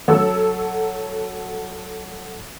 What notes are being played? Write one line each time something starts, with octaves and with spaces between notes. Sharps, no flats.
F#3 A4 E6